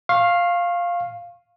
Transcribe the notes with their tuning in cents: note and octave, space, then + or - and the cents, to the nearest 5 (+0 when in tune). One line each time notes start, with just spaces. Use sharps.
F5 +0 C#6 -35